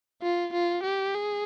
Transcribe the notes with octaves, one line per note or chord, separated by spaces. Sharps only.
F4
F4
G4
G#4